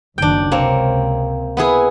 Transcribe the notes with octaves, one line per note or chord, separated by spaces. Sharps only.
F#1 F#2 D#3 D4 G5
C#2 C3 A#3 C4 C#5
B3 E4 G#4